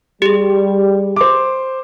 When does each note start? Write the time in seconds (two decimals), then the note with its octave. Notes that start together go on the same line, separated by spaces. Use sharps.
0.22 G3 G4 G#4
1.16 C5 D6